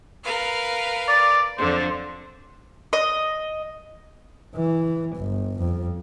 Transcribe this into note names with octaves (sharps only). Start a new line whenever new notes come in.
A#4 B4 F5
D5
F2 D3 C5
D#5
E3
G1
F2